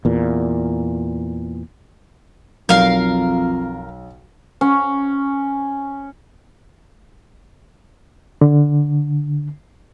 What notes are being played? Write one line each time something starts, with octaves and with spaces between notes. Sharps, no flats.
E2 A#2
B1 F2 A#4 F5
C#4
D3